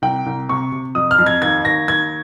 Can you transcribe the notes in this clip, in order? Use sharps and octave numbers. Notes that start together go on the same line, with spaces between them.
C2 G5
C2
C3 C#6
C3
F2 D#6
F6
F2
G#6
D#2 G#6
D#2 A#6
D#2 G#6